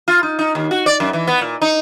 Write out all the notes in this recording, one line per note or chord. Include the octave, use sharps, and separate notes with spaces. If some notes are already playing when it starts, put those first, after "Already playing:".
F4
D#4
D#4
D#2
F#4
D5
F#2
E3
B3
A#2
D#4